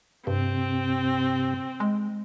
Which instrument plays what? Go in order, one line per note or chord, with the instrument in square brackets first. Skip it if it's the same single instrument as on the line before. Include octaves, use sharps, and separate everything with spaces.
[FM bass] G2 [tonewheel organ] C3 [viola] C4
[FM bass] G#3